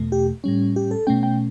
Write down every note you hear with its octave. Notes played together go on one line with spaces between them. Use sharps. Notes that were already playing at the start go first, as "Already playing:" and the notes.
Already playing: E2 B2 A3
G4
A2 G3 C#4
G4
A4
B2 A3 C#4 G5
G5